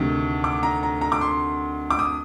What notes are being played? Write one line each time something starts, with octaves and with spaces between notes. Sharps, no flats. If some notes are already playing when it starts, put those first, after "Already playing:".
Already playing: D2 C3 D#3
D6
A#5
A#5
A#5
D6
C6
D6
D#6